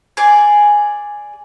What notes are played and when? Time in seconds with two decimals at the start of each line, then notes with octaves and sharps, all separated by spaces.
0.17 G#4 D5